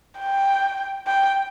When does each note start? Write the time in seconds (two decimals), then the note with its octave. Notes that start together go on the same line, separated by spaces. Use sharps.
0.19 G5
1.07 G5